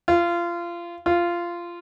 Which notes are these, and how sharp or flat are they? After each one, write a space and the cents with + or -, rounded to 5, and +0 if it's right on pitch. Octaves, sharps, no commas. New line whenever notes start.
F4 -25
F4 -15